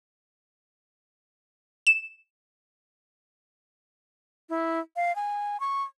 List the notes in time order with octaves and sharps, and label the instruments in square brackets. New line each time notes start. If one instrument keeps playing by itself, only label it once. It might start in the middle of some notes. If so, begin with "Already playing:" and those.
[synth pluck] E7
[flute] E4
F5
G#5
C#6